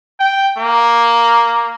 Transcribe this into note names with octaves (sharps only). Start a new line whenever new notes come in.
G5
A#3